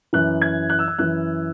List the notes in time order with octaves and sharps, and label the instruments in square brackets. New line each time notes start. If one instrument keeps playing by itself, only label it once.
[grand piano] F#2 E3 F#6
G#6
F#6
E6
F#6
F#2 E3 F#6